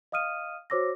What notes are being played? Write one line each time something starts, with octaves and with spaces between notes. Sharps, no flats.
D#5 F5 D#6 F6 D#7
F#4 C5 C#5 D6 E6 A#6